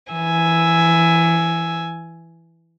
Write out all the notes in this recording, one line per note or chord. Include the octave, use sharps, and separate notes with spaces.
E3 G#5 E6